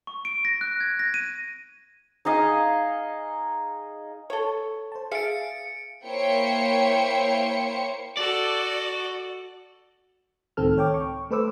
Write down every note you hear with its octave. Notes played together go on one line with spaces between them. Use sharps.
C#6
D7
A#6
F#6
G#6
A#6
D#7
D#4 G#4 D#5 F5
A4 C#5
C5 A5
G#4 E5 F5 A6 C#7 D7
A#3 E4 C5 C#5 G5 C#7
F#4 A4 D5
C#2 A2 D#3 C4 A4 F6
C#5 G5 D6
C#6
A3 A4 B4 C5 D6 E6